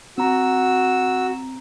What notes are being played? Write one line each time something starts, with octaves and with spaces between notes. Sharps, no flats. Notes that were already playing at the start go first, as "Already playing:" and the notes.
C4 F#4 A#5 E6